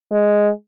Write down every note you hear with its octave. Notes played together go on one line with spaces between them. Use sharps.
G#3